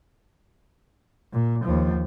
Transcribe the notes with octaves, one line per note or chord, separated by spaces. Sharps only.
A#2
D#2 F3